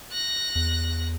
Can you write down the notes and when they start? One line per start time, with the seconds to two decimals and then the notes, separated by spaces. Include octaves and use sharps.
0.11 F#6 A#6
0.55 E2